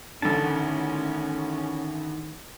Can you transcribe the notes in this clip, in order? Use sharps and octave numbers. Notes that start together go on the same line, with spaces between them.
A1 D3 D#3 B3 C#4 A5